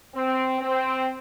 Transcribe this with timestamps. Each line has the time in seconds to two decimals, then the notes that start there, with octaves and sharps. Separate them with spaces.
0.15 C4
0.61 C4